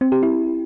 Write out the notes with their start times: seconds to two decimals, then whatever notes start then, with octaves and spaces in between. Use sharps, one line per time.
0.01 C4
0.12 G4
0.23 E4